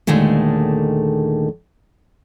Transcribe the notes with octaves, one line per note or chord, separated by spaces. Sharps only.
D#2 A#2 D3 D#3 G#3 A3